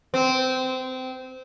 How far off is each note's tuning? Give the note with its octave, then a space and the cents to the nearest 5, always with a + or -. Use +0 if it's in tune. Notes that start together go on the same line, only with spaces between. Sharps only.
C4 -20